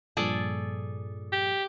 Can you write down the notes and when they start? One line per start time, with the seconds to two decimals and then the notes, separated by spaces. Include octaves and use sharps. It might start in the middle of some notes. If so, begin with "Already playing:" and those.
0.17 G2 A#2 F3 G#4 A4 D5
1.32 G4